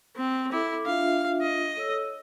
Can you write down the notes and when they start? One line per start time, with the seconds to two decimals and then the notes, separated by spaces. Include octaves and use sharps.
0.16 C4
0.52 E4 A4 D6
0.86 D4 F4 E5 F5
1.41 D#5
1.77 A4 C#5 E6